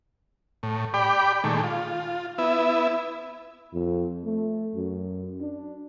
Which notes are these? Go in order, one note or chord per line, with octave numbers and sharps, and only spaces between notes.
A2
G4 D5 G5 B5 D6
A#2 D#3 G#3 A3
F4
B3 E4 E5
F2
A3
F#2
D4